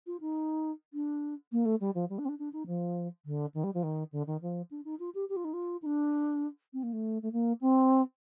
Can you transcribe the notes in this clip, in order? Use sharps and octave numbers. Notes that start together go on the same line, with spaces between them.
F4
D#4
D4
A#3
A3
G3
F3
G3
D4
C4
D4
D4
D#4
F3
D3
D#3
G3
F3
D#3
D3
D#3
F3
D4
D#4
F4
G4
G4
F4
D#4
F4
D#4
D4
C4
A#3
A3
A3
A#3
C4